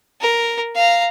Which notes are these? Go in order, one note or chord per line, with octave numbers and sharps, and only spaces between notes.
A#4
F5 A#5